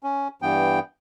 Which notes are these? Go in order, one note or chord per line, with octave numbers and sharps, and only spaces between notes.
C#4
G2 E3 B3 G5